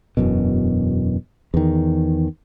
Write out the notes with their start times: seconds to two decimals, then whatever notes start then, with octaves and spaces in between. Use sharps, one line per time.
0.17 E1 F#2 B2
1.54 E2 D#3